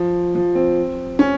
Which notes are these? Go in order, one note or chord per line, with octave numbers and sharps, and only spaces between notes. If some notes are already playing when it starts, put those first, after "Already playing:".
Already playing: F3
F3
C4
C#4